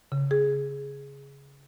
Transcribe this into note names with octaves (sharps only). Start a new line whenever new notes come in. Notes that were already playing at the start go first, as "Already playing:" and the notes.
C#3
G#4